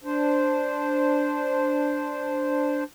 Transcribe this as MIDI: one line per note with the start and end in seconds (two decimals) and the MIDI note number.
0.04 2.84 62
0.04 2.84 72